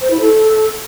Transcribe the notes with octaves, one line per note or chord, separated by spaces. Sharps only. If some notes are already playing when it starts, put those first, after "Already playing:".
C5
E4
A4